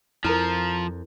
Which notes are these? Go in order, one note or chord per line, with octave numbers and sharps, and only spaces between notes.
F2 F3 E4 A#4 A#5 F6